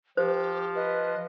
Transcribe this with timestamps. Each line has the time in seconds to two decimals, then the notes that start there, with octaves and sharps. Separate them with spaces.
0.17 F3 G4 C5
0.75 B4 D#5